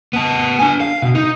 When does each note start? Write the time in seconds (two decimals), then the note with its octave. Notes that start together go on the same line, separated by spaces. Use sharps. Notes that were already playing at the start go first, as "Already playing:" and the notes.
0.13 B3 A5
0.59 D4 G#5
0.80 F5
1.02 B2
1.15 D#4